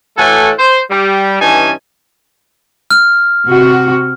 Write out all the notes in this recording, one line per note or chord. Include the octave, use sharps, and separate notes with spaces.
A2 E3 A3 F#4 A4 G#5
C5
G3
G2 E3 C#4 D#4 G#5 A5
F6
C3 F#4